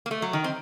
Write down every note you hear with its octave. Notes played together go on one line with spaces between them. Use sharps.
A#3
A3
F#3
D#3
C4